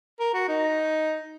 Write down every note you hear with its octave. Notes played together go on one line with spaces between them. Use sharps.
A#4
F#4
D#4